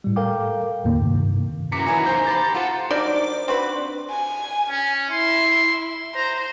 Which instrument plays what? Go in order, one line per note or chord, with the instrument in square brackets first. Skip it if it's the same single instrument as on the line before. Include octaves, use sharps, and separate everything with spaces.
[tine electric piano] A2 G3
A4 A#4 F5 G5 D6
D#2 A2 D3 A#3
G2 C3 D#3
[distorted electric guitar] F#2 E3 [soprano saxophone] A#5 [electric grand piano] D6 B6 C#7
[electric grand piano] D#3 E3 E4 [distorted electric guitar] F#3 B4 [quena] G#5
[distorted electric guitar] D#3 A#3 [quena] C5 [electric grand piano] G6
[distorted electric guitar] G4 [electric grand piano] B5 D6 A6
[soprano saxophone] F4 [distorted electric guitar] A4 [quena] F#5 [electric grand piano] A#5
[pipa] D#3 F#3 G3 [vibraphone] D4 C5 [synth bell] D5
[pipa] C4 F#4 B4
[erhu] G#5
[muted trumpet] C#4
[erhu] E4 [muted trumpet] C6
[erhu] C5 [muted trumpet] A#5